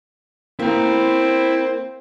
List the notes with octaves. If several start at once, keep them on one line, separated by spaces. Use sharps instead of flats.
A#3 C4 E4 A#5